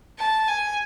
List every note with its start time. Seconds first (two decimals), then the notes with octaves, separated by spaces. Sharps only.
0.19 A5
0.48 G#5